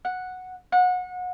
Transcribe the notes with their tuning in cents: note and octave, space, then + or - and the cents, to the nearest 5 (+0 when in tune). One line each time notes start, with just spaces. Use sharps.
F#5 -5
F#5 -30